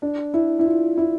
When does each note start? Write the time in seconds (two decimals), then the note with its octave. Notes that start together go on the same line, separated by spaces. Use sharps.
0.02 D4
0.34 E4
0.59 E4
0.66 F4
0.97 E4